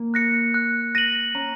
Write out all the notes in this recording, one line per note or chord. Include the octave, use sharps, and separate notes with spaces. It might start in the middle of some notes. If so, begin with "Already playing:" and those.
Already playing: A#3
F#6 A#6 C#7
F#6
A#6 D#7 F#7
C#4 A#5